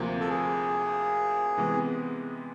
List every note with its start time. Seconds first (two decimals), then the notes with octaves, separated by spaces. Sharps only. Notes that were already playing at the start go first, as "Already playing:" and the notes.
Already playing: D2 C3 F3 A#3
0.20 A4
0.28 G#4
1.57 C3 E3 G#3 B3